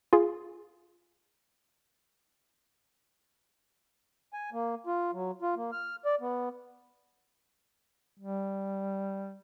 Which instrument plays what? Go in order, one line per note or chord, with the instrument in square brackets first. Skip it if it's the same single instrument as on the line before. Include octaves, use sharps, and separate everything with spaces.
[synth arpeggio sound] F4 G#4
[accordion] G#5
A#3
F4
F#3
F4
A#3
F6
D5
B3
[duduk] G3